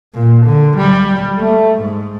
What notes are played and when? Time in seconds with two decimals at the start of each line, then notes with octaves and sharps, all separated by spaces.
0.14 A#2
0.46 D3
0.77 G3
1.38 A3
1.79 G#2